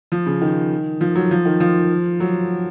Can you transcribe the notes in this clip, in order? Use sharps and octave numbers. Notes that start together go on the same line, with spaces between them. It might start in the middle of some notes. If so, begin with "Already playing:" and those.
F3
C#3
D#3
F3
F#3
F3
D#3
F3
F#3